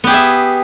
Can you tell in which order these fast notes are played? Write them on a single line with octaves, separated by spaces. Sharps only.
B3 G4 G#4 E5